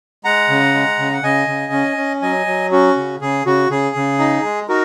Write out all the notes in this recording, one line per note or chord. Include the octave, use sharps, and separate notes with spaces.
G#3 F#5 A#5
C#3
G#3
C#3
F#5
C#3 D#5 G#5
C#3
C#4
C#4
F#3 D#5 G#5
F#3
C#4 F#4
C#3
C#3 G#4
C#3 F#4
C#3 G#4
C#3
D#4
G#3
D#4 F#4 A#4